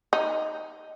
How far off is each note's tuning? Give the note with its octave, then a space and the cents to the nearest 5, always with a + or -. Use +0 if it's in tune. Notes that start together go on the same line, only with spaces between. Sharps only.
D#4 +5